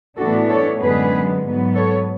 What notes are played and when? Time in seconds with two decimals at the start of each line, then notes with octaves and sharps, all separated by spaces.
0.18 A2 E3 B3 D4 F#4 A4
0.50 A4 C#5
0.81 F#2 D3 G#3 B3 G#4 B4
1.44 G#2 F#3 B3
1.75 A4 C#5